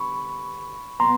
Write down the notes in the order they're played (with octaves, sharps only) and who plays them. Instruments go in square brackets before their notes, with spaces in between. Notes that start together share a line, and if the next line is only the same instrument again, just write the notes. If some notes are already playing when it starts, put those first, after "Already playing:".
Already playing: [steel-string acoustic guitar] D3 G3 B3 [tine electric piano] B5 C#6
[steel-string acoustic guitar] B2 F#3 B3 [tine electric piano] A#5 C6